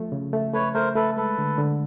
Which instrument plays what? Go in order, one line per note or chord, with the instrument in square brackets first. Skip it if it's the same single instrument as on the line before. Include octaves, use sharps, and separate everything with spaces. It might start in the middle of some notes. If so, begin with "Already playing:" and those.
Already playing: [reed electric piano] F3 A3
C#3
A3
[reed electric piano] A3 [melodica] B4 C#5
[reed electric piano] A3 [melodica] A#4 C5
[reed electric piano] A3 [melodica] A4 B4
[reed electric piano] G#3 [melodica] A4 B4
[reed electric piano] D3
D3